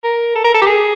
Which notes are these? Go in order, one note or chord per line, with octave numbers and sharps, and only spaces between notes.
A#4
A4
A#4
A4
G4
G#4